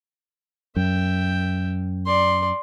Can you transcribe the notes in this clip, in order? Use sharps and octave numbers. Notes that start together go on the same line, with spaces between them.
F#2 E5 G5
D5 C6